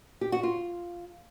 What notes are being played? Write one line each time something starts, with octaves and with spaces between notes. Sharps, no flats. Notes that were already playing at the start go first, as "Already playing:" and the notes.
G4
F#4
F4